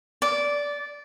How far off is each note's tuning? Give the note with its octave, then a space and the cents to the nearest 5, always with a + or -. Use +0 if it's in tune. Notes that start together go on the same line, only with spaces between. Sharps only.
D5 -15